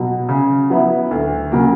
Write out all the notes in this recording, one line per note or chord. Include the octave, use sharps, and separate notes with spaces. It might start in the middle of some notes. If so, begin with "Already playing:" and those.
Already playing: B2 F#3
C#3
F#3 B3 E4
D2
C#3 F#3 A#3